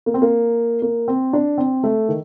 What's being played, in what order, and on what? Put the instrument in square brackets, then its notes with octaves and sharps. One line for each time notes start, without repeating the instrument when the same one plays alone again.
[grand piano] A#3
C4
A#3
A#3
C4
D4
C4
A3
D#3